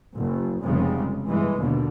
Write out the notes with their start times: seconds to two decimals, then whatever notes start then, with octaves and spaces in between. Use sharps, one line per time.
0.14 F#1
0.62 F1 C#3 G3 G#3
1.25 G1 E3 G#3
1.59 D#2 B2 D3